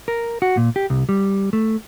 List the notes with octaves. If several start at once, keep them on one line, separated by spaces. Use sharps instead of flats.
A#4
F#4
A#2
G4
C2
G3
A3